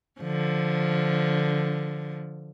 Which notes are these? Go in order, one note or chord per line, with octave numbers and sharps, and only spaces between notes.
D3 F3